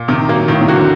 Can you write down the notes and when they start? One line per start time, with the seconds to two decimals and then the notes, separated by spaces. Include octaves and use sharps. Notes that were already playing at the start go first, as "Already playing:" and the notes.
Already playing: A#2
0.08 C3 D#3
0.29 F#3 A#3
0.48 A2 D#3
0.61 C3
0.68 F#3 A#3 F#4
0.74 D3